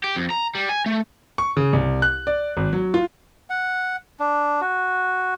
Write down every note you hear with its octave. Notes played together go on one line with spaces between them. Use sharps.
G4
F2
A#5
G3
G#5
A3
C#6
C#3
C2
F#6
D5
G#1
F#3
F4
F#5
D4
F#4